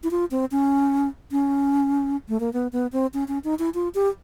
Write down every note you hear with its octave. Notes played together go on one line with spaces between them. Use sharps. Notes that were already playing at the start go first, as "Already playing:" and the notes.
E4
F4
C4
C#4
C#4
A3
A#3
B3
B3
C4
C#4
C#4
D#4
E4
F4
G4